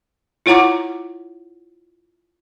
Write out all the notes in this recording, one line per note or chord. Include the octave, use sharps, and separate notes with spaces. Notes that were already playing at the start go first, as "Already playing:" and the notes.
E4 F4 C#5 F#5 A#5 D6